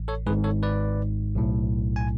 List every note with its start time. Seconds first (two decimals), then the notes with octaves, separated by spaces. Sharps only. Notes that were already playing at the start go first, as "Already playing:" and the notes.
Already playing: A1
0.08 A4 C#5
0.26 G#2 G#4 B4
0.29 G#1
0.44 A4 C#5
0.63 B4 D5
1.35 B1 A2
1.96 G#5